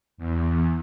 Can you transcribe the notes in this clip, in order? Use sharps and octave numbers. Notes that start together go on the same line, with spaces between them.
E2